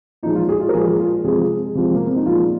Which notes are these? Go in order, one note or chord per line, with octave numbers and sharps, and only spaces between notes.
A#2 F3 G#3 D#4
F4
G#4
F4
A#4
A#2 F3 G#3 G#4
F4
C3 F3 G#3 G#4
C3 F3 G#3
A#3
C4
D#4
A#2 F3 G#3 F4